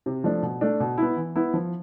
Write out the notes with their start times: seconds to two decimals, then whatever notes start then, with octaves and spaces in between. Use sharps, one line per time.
0.06 C3
0.24 F3 A3 D4
0.42 B2
0.61 A3 D4
0.80 B2
0.98 B3 E4
1.16 E3
1.36 B3 E4
1.54 F3